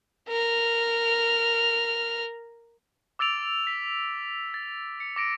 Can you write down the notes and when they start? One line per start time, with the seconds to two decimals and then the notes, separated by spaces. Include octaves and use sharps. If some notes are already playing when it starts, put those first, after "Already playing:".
0.29 A#4 F6
3.19 D6 E6 A6 D7 F7
3.67 B6
4.54 A6
5.00 C#7
5.16 D6 A#6 D7